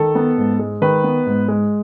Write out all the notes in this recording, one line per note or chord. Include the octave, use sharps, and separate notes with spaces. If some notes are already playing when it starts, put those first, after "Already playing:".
Already playing: D#3 A4
B3
G#2
G#3
D#3 B4
B3
G#2
G#3